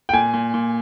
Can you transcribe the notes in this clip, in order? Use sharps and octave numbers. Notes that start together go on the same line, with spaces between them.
G5
A#2 G#5
A#2
A#2